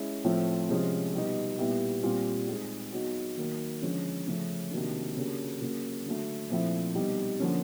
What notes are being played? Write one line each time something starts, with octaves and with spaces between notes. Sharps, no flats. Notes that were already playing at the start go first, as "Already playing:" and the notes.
Already playing: G#3 C#4 E4
A2 F3 A3 C4 F4
C3 F3 G#3 C#4 F4
B2 G3 B3 D#4
A#2 G3 B3 E4 G4
A#2 G3 C4 F4
G#3 C4 D#4 G#4
F#3 B3 D#4 F#4
D#3 F#3 A#3
D3 F3 G#3 C#4
C#3 F3 A3 C#4
C3 D#3 F#3 A#3 D4
C#3 F#3 A#3 D4 G4
C#3 F#3 A#3
D3 F#3 A3
A#2 F3 A3 C4 E4
B2 G3 C4 D#4
D3 F3 A#3 C#4